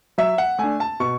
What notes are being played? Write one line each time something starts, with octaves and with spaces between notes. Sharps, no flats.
F#3 E5
F#5
A3 D4 G#5
A5
B2 C#6